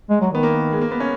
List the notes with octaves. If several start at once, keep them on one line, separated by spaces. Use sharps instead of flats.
G#3
F#3
D#3 B3
A#3
G#3
A#3
B3
C#4